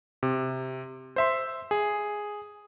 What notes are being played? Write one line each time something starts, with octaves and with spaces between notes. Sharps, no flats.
C3
C5 E5 C6
G#4